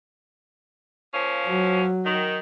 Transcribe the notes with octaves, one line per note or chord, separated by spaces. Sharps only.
F3 A#3 C#4
F#3
D#3